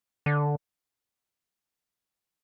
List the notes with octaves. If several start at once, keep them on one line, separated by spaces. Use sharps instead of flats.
D3